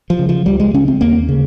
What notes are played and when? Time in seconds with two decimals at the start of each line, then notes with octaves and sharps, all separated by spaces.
0.10 F3
0.19 C#3
0.29 F3
0.46 C#2 G3
0.60 G#3
0.74 C#3 C#4
0.88 C4
1.01 D#2 A#3
1.29 C#3